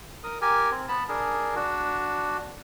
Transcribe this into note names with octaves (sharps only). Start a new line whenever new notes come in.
A#4 D#6
G4 A#4 G#5
C4
B3 A5 B5
D4 G#4 A#4
D4 F#4